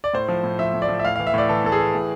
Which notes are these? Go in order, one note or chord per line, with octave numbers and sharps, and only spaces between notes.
D5
A2 C5
F3
A2
F3 E5
A2
D5
F3
E5
A2 F5
E3 F5
E5
A2 D5
E3 A4
A2 A4
G#4
E3
A2